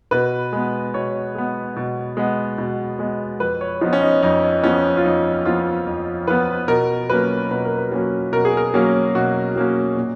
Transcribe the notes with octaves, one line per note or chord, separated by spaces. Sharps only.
B2 B4
G#3 B3
B2 C#5
G#3 B3
B2
G#3 B3
B2
G#3 B3
F2 B4
C#5
F3 B3 D#4
C#4
D#4
F2 D#4
F3 B3 C#4
F4
F2 D#4
F3 B3 F4
F2
F3 B3 B4
B2 A#4
F#3 A#3 C#4 B4
B2 B4
A#4
B4
F#3 A#3 C#4
B2 A#4
G#4
A#4
F#3 A#3 C#4
B2 F#4
F#3 A#3 C#4
A#2